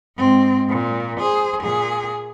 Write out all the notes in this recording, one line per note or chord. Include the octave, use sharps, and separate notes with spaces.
G#2 C4
A#2
G#4 C5
A#2 G#4